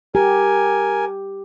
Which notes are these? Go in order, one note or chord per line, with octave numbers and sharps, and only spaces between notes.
G4 A#4 G#5